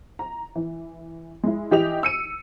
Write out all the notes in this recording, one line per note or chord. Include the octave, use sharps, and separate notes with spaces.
A#5
E3
G#3 E4
E3 G4 D#5 F7
E6 C#7 D#7